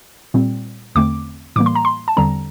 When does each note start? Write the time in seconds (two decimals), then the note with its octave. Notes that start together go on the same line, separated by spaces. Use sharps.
0.34 A#2 G3 C4
0.95 E2 D3 A3 C4 D6
1.56 A2 E3 G3 A#3 D6
1.66 C6
1.75 A#5
1.85 C6
2.08 A5
2.17 E2 D3 G3 C4 A#5